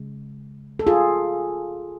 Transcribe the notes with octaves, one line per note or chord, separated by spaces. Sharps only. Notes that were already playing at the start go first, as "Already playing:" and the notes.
Already playing: C#3 G#3
A4
F4 G#4